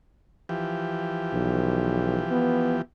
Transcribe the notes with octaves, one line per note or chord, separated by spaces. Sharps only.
E3 F3 G4
B1
B3